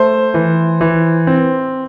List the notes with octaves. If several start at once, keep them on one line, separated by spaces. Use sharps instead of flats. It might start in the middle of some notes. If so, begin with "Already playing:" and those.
Already playing: A3 C5
E3
E3
C4